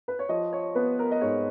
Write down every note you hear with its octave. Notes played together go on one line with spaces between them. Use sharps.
B4
C#5
F3 D#5
C#5
B3 B4
A#4
D#5
G#2 C#5